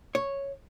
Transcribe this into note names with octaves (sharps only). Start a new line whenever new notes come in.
C#5